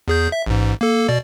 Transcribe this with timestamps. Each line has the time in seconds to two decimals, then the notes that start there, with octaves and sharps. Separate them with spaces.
0.08 E2 G#4 G6
0.32 E5
0.46 A1 G#2
0.81 A#3 A4
1.09 B2 D5